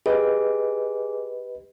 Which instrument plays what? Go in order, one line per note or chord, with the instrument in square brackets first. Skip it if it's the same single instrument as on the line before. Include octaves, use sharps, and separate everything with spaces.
[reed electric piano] G4 B4 D#5 [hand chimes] G#4